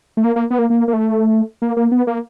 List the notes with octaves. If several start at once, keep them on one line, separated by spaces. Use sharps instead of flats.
A3
A#3
A#3
B3
A#3
A#3
A#3
A3
A#3
A#3
B3
A#3